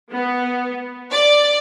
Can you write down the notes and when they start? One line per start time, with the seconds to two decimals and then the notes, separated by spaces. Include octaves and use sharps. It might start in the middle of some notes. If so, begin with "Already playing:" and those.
0.11 B3
1.11 D5